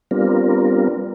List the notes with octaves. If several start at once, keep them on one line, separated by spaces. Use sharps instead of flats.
G3 B3 C4 D4 F4 A#4